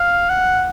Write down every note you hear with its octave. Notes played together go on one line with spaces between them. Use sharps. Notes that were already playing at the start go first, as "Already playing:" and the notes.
Already playing: F5
F#5